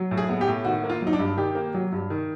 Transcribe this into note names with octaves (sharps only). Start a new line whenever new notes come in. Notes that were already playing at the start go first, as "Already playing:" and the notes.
Already playing: F#3
A2
G#4
B3
G4
A2
D#3 F#4
A#3
F4
F#3 D#4
D4
G2
D#3 G4
A#3
F#3
G2
D#3